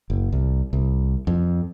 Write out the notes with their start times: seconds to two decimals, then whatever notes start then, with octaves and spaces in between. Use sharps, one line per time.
0.10 F#1
0.32 C2
0.73 C2
1.27 F2